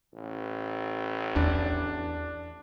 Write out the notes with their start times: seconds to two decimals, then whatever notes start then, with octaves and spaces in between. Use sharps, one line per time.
0.14 A1
1.36 E2 D4